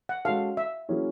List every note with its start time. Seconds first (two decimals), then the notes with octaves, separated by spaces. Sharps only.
0.09 F#5
0.25 G#3 C#4 F#4 A4 F5
0.57 E5
0.89 F#3 A#3 C#4 E4 G#4